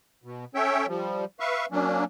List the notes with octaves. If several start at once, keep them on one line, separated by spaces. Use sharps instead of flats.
B2
C#4 A4 C#5 E5 G5
F3 G3
B4 E5 F5 C#6
F#3 A#3 C#4 D4